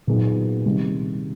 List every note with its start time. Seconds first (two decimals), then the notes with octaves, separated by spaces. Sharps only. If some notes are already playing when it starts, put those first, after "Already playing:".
0.07 A#2 F#3 B3 D#4 G#4
0.65 C3 D#3 G3